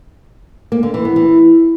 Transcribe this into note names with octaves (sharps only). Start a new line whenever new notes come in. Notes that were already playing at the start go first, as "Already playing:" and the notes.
A#3
D3
E3
B3
E3